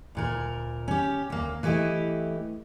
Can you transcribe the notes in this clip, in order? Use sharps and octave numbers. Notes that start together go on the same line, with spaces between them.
D2 A#2 A#4
C#4 G4
D2 A#3
E3 A3 E4 G4 D#5